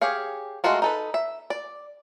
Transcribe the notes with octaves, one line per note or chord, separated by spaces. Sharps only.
G4 G#4 C#5 F5
G#3 A3 F4 F#4 A#4
D#4 A4 B4
E5
D5